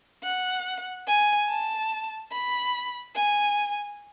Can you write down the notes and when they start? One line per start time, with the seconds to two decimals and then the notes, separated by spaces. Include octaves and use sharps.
0.23 F#5
1.07 G#5
1.49 A5
2.32 B5
3.15 G#5